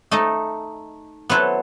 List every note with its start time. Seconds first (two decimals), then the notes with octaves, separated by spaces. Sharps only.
0.11 A3 D#4 A4 D#5
1.29 F#3 B3 E4 A4 C5